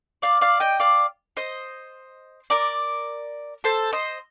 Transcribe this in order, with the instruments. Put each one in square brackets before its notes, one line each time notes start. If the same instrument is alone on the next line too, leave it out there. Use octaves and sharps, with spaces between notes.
[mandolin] D5 F5
D5 F5
D#5 G5
D5 F5
C5 D#5
A#4 D5
A4 C5
C5 D#5